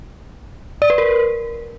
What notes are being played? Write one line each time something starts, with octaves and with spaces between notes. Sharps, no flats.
D5
B4
A#4